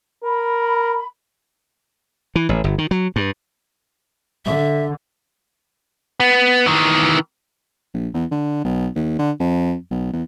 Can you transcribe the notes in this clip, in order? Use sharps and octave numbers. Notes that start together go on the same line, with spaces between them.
A#4 B5
E3
A1
G1
D#3
F#3
G2
D3 E5
B3
D#3 E3
A#1
E2
D3
B1
D#2
D3
F2
B1
E2